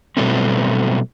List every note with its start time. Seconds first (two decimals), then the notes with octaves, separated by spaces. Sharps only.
0.17 B2 F#3 G3 A3 C4